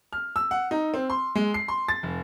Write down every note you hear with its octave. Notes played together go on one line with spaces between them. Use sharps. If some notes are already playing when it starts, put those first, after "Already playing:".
F6
E6
F#5
D#4
C4
C6
G#3
C7
C6
A6
F1